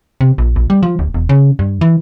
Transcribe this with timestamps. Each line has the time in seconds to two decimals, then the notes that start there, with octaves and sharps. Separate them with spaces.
0.21 C3
0.38 A#1
0.56 A#1
0.70 G3
0.83 F3
0.99 D1
1.14 E1
1.29 C#3
1.59 G2
1.81 E3